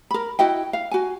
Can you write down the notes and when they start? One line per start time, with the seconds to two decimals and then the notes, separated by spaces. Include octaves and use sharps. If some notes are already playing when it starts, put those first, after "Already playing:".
0.11 A#4 B5
0.39 E4 F#4 D#5 G5
0.73 F5
0.91 F#4 G#5